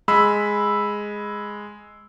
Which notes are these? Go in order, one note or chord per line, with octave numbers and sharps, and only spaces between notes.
G#3 B5 E6